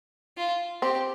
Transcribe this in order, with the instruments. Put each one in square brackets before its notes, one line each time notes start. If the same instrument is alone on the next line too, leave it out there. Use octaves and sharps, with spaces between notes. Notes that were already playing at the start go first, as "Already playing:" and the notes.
[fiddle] F4
[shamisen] C4 [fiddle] G4